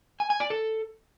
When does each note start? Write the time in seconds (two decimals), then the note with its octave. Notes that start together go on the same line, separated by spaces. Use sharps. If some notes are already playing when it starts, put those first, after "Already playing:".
0.20 G#5
0.30 G#5
0.40 D5
0.50 A4